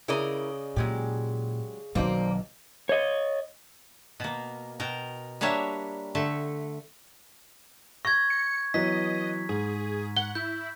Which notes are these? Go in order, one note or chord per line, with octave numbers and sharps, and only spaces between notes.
C#3 E4 A#4 D5 D#5
A#2 F#3 G#3 G4
B1 B2 D#3 F#3 A#3 C4 C5 D5
C#5 D#5
B2 A#3
B2 A#4 G5
G3 A#3 D4 C#5 E5 F#5
D3 A3 E5
C#6 G#6 A#6
C#7
E3 F#3 B3 D#5 B6
G#2 G#4
F#5 G7
E4 G6